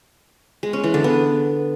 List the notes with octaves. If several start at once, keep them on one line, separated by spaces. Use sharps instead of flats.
G#3
C#4
E3
D3
B3